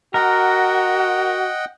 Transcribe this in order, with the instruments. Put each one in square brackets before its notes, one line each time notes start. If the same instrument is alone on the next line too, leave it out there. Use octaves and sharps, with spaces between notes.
[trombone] F#4 [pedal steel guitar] A#4 [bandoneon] D#5 F#5 G5